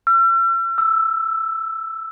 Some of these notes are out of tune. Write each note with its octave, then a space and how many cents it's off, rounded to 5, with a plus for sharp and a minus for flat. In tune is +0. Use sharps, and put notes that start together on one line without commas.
E6 +45
E6 +0